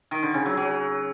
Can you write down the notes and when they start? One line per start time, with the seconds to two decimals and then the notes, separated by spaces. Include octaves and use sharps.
0.11 D#3
0.23 D3
0.34 C#3
0.46 F#3
0.57 F#3